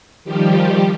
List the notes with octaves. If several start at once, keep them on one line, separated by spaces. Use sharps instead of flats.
D#3 F3 G3 G4